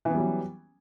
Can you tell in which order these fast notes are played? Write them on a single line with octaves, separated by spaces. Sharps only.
E3 B3 G3 F#3